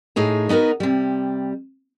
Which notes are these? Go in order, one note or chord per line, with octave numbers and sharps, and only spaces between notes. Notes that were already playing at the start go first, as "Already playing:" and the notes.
A2 D#4 G#4 C#5
B3 D#4 F#4 A#4 B4
C3 G3